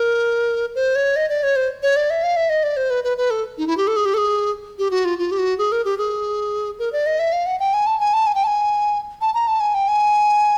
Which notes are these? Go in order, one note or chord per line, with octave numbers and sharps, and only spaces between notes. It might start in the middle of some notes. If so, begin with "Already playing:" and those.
Already playing: A#4
C5
C#5
D#5
D5
C#5
C5
C#5
D5
E5
F5
E5
D#5
D5
C5
B4
B4
B4
A4
D#4
E4
G4
A4
G#4
G4
A4
G#4
G4
F#4
F4
F4
G4
F#4
G#4
A#4
G4
G#4
A#4
D5
D#5
E5
F5
F#5
G5
G#5
A5
G#5
A5
G#5
G5
A5
G#5
A5
A#5
A5
G#5
G5
G#5